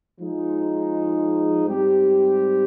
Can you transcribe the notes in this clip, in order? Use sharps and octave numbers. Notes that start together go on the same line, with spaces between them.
F3 G#3 D#4
G#2 G3 C4 G4